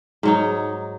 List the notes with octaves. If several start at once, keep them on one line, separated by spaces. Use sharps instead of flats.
G#2 F#3 D#4